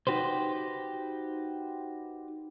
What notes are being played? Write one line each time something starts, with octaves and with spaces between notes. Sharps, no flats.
D#4 F#4 G4 B4 C5